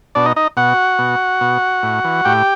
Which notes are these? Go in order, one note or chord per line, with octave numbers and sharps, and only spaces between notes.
B2 D4 D5
D#4 D#5
D#4 D#5
B2 F#4 F#5
B2
B2
A2
E3
A2 G4 G5